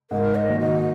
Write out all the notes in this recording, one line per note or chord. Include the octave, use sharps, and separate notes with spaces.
G#2 A#4
D#5
D#3 A#3 F#4
D#5